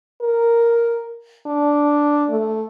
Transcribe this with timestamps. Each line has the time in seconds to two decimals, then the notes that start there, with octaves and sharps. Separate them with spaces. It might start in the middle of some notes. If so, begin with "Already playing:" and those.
0.21 A#4
1.46 D4
2.30 A3